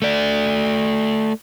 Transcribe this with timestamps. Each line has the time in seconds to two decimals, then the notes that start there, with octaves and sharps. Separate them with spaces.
0.02 A3 D5